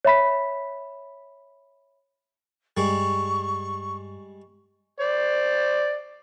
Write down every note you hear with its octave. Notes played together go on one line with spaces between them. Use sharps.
C#5 E5 B5 B6
G2 G3 G#3 C#6
C5 D5